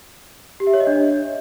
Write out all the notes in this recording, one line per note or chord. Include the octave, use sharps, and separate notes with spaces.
G4
E5
C#5
D#5
D4